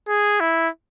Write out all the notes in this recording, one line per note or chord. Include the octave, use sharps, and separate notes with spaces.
G#4
E4